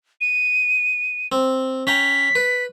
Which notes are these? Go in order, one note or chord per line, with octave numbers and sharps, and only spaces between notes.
D#7
C4
C#4 G5 A#5 B6
B4